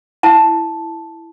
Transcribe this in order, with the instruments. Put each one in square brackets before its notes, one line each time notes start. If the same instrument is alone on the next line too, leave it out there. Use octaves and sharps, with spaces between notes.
[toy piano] E4 A5 A#5